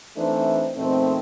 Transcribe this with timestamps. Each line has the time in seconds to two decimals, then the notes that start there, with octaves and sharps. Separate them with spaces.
0.16 E3 A3 C4 D4 D#4 C5
0.76 F2 B2 D#3 A3 C4